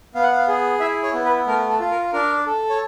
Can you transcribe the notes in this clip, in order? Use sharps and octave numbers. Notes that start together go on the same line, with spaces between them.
B3 F5
F#5
F5
G#4
E4 E5
C#5
B3
B4
A3 A#4
A4
F4
A#4
D4 A#4
A4
C#5